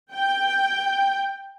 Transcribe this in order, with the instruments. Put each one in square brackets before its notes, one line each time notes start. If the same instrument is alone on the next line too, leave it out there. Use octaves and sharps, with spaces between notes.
[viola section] G5